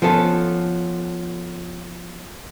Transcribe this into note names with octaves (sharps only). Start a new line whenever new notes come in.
F3 B3 C#4 A4